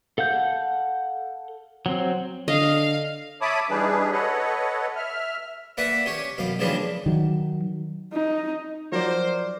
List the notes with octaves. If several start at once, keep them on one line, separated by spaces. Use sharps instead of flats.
A4 F5 F#5 G6
F#3 C4
D3 D#5 F5
C#5 E5 A5 B5 D6 D#6
E3 G3 D4 D#4 G#4 B4
A4 B4 C#5 D#5 F#5
E5 F6
A#3 B4 D5 E5 F#5
C#4 G4 C#5
F#2 B2 F5
C#3 E3 F3 G3 A#3 D4
D#3 F#3
D#4
F3 F#3 D#4 A#4 C5 D5